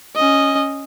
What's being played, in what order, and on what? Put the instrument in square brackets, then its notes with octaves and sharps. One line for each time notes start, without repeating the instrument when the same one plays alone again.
[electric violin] C#4 D#5